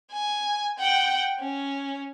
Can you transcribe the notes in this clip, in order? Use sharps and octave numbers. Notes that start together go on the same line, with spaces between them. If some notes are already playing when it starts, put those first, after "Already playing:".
G#5
F#5 G5
C#4